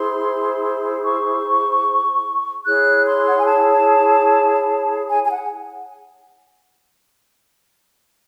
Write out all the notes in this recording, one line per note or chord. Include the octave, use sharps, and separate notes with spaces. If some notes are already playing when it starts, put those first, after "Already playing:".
Already playing: E4 G#4 C5 C6
C#6
E4 G#4 C#5 F#6
C6
F#5
G#5
A5
G#5
G#5
F#5